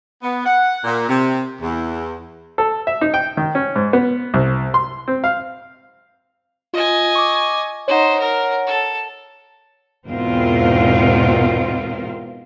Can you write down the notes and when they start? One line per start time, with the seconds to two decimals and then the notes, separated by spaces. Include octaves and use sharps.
0.23 B3
0.46 F#5
0.85 A#2
1.09 C3
1.62 E2
2.58 A4
2.87 E5
3.01 D#4
3.14 G5
3.37 D#3
3.55 C#4
3.76 G#2
3.93 B3
4.34 C2
4.74 C6
5.08 C4
5.24 F5
6.73 F4 D#5 G#5
7.15 C#6 D6
7.88 D#4 C5 C#5 F#5
8.19 A#4
8.67 A4
10.07 E2 G#2 B2 C4 F4 A#4